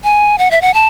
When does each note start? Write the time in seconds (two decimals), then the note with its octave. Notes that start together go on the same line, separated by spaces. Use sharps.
0.04 G#5
0.38 F#5
0.51 E5
0.62 F#5
0.74 A5